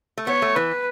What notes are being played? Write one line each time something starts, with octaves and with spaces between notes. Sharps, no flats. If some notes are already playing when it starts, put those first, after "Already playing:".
A3
B3 C#5
A3
E3 B4